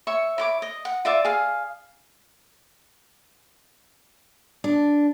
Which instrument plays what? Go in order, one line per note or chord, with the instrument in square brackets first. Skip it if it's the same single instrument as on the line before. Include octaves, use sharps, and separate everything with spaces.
[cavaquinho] C#5 E5 C#6
E4 C#5 D6
D#5
F#5
F4 D5 E5 D6
G#4 F5
[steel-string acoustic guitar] D4